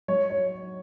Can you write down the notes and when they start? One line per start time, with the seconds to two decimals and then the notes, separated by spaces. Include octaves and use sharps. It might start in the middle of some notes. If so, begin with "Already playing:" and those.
0.08 F#3 C#5
0.30 C#5